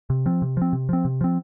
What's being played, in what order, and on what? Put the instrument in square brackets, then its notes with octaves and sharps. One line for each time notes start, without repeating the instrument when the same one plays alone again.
[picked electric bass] C3
F3 C4
C3
F3 C4
C3
F3 C4
C3
F3 C4